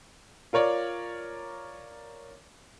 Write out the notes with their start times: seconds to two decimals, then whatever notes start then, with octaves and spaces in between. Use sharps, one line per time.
0.53 F4 A#4 C#5 D5